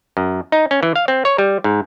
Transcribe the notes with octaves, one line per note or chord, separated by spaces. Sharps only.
F#2
D#4
C#4
E3
F5
C4
C#5
G3
G#2